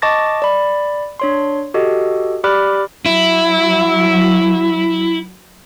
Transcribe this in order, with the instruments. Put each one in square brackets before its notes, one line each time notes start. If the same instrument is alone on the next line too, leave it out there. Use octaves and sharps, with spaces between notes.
[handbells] D#5 A5 C#6 D6 A6 A#6
D5 B5
D4 C#5 C6
F#4 G4 A4 D#5
G4 D5 B5 D6 F6 F#6
[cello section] F#3 [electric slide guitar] E4